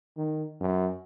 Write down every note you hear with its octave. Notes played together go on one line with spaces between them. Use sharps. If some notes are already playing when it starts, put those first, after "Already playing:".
D#3
F#2